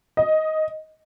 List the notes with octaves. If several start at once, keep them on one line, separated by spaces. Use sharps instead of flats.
D#5